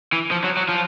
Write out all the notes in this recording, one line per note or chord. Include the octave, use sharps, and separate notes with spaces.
E3
F3
F#3
F#3
F3